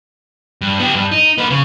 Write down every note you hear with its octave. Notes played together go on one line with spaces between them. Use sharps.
G2
B3 G4
G2
D#4
A#3 B4
C#3